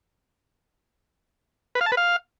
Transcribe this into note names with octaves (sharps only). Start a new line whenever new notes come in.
B4
F5
A5
B4
F5